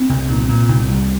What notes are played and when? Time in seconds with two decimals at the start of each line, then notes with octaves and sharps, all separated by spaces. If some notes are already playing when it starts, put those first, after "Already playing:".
Already playing: C4
0.09 C2
0.29 A#2
0.49 A#2
0.68 C2
0.88 C2